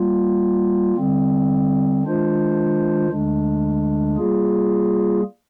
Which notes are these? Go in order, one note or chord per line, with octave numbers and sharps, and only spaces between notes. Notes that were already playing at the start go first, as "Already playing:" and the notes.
Already playing: G3 A#3 F4
D3 G3 C4
D#3 G#3 D4 F4 C5
D2 D3 G#3 D4
G3 A#3 F4 G#4